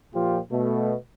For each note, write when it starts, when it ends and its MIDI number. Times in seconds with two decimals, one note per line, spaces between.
0.13 0.38 46
0.13 0.38 53
0.13 0.38 65
0.13 0.38 67
0.51 0.94 47
0.51 0.94 57